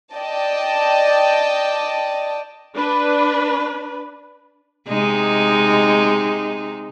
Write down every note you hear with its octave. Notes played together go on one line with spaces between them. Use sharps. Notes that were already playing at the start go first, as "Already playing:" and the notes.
D5 D#5 G5 A5
D4 B4
C3 G#3 D#4